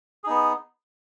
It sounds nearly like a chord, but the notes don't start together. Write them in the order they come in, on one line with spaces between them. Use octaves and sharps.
G#4 D#4 B3